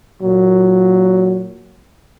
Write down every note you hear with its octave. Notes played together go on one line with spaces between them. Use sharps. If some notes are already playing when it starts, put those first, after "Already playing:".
A#2 F#3